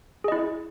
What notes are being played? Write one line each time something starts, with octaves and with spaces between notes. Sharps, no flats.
E4 G#4 D#5